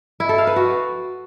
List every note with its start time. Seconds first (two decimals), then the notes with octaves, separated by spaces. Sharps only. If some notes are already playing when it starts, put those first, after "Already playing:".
0.20 E4
0.29 A4
0.38 F5
0.47 B4
0.56 F#4